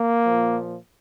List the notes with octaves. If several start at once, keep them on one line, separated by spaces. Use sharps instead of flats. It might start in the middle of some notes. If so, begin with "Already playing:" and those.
Already playing: A#3
A#2 F3